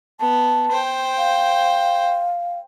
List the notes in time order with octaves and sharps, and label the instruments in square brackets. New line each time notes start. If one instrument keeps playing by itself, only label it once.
[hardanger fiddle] B3 [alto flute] A5
[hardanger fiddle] C5 G5
[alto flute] F5